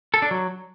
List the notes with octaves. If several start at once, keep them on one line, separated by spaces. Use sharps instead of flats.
A4
D4
F#3